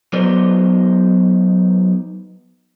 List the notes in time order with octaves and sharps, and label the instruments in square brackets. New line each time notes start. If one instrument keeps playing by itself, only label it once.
[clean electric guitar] F#3 B3 D#4 C5 D5